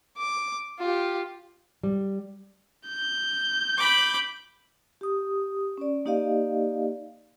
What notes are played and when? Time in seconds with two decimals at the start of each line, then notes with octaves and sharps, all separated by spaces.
0.17 D6
0.79 F4 G4
1.83 G3
2.87 G6
3.78 B5 D6
5.01 G4 D#6
5.78 C#4 D5
6.05 A#3 D#4 G4 D5 D#5 F5